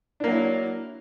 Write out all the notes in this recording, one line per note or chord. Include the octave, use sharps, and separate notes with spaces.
F#3 A#3 D4 E4